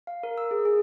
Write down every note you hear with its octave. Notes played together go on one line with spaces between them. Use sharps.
F5
A#4
E6
G#4
G#4